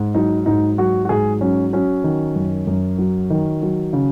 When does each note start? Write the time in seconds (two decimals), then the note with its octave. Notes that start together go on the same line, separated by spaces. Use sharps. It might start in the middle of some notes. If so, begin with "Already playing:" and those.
Already playing: G#2
0.14 F#3 D#4
0.46 G#2 D#4
0.78 F#3 F#4
1.05 F#4
1.09 G#2 G#4
1.41 F#3 C#4
1.73 F#3 C#4
2.04 D#3
2.36 F#2
2.67 F#2
2.98 F#3
3.30 D#3
3.62 F#3
3.93 C#3